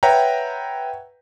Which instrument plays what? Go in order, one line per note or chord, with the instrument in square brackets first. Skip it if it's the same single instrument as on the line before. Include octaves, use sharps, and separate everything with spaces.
[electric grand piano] B4 C#5 E5 F#5 G5 A#5